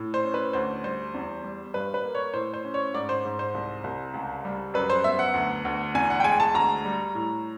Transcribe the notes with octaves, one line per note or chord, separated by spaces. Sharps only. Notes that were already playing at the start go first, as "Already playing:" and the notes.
Already playing: A2
C5
C#4
B4
D2 C5
G3 C5
E2
G3
G2 B4
B4
A#3
C#5
A2 C5
C5
C#4
C#5
G#2 D5
C5
G#2
C5
C2
C2
C#2
G3
F#2 B4
C5
B3 E5
F#5
D2
D2
E2 G#5
F#5
G5
G#3 G#5
A5
D2 A#5
G3
A2